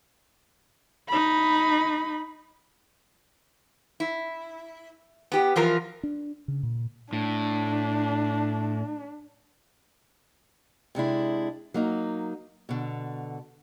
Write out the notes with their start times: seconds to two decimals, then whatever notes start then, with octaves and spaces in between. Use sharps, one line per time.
1.08 D#4 B5
4.00 E4
5.32 B3 G4
5.56 E3 F3 F4 A#4
6.03 D4
6.48 C#3
6.63 A#2
7.13 A2 D4
10.95 C3 G#3 D4 E4
11.74 F#3 A#3 D#4
12.69 B2 D3